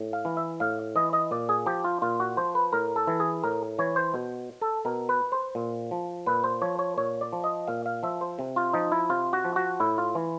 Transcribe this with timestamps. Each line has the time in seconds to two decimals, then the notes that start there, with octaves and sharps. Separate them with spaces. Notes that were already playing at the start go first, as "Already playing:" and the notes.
Already playing: A2
0.13 F5
0.25 E3
0.37 E5
0.60 A2 F5
0.96 E3 D#5
1.13 D#5
1.31 A#2 D5
1.49 G#4
1.66 F3 G4
1.84 F4
2.02 A#2 F4
2.20 F#4
2.37 F3 C5
2.55 B4
2.72 A2 A#4
2.96 A4
3.07 E3
3.20 G#4
3.43 A2 A#4
3.79 E3 C#5
3.96 C5
4.14 B2
4.61 A4
4.85 B2 A#4
5.09 B4
5.32 C5
5.55 A#2
5.91 F3
6.26 A#2 B4
6.44 C5
6.62 F3 C#5
6.79 C#5
6.97 A#2 C#5
7.21 D5
7.33 F3
7.44 D#5
7.68 A#2 F5
7.86 F5
8.03 F3 E5
8.21 C5
8.39 C3
8.56 F4
8.73 F3 D#4
8.92 E4
9.10 C3 F4
9.33 F#4
9.45 F3
9.56 F#4
9.80 A2 E4
9.98 F4
10.15 E3